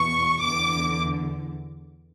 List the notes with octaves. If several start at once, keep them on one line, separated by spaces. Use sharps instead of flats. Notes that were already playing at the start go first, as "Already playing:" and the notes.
Already playing: E2 B2 C#6
E2 D3 D6